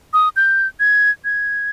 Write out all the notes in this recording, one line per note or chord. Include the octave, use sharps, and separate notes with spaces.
D#6
G6
G#6
G#6